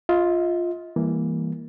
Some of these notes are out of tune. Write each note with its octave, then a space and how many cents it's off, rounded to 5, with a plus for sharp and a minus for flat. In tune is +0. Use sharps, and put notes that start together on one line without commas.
F4 +0 D#5 +40
E3 +0 G3 +35 A#3 +0